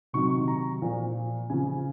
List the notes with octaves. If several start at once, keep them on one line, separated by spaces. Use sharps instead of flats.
C3 D#3 F#3 C#6
A#5
A#2 F3
C#3 F3 G#5